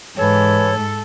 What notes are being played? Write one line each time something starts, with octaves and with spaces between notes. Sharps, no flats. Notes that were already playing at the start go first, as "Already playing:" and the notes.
G#2 E3 A4 C#5